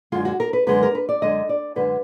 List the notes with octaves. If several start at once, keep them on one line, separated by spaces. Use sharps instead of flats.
F#2 D3 G#3 F4
F#4
A#4
B4
F#2 D3 G#3 B4
A#4
B4
D5
F#2 D3 G#3 D#5
D5
F#2 D3 G#3 B4